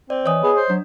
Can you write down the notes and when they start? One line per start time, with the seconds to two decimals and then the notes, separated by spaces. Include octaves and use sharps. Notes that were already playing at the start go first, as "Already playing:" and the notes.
0.10 C4 D5
0.26 E3 C#5 D#5 D#6
0.43 B3 G#4
0.56 C5
0.70 F#3 D4